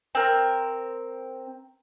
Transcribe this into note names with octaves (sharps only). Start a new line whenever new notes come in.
C4 A#4